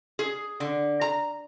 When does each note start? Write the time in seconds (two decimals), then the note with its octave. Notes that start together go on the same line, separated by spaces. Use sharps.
0.19 G#4
0.60 D3
1.01 A#5